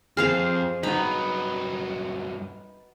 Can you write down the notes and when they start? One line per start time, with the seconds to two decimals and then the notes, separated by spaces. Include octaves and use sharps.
0.17 F2 G#4 C5 F5 F6
0.83 G2 F#3 B3 D#4 B5